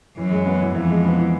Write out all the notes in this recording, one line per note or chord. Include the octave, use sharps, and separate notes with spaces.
F#2 E3
G#3
B3
E3
F2 E3
G#3
B3
E3